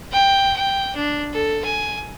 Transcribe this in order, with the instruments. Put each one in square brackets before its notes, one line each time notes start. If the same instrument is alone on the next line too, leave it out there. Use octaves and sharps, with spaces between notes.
[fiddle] G5
G5
D4
A4
G#5